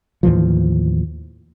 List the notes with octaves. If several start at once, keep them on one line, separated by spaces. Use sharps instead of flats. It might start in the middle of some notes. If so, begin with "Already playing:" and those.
D#2 A2 E3 F3